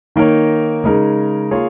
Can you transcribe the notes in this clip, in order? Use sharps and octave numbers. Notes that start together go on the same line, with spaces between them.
D#3 A#3 D#4 A#4 C#5
C#3 G#3 D#4 A#4
A#3 F4 G#4 C#5